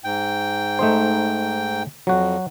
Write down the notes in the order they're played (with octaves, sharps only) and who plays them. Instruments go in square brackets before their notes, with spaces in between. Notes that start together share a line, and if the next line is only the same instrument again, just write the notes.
[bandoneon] G#2 G5
[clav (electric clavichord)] A3 D#4 C5
[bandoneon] F2 [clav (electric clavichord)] F#3 F#4